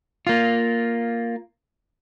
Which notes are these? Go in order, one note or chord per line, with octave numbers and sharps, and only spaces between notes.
A#3 F4